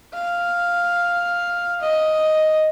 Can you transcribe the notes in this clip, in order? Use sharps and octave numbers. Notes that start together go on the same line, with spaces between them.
F5
D#5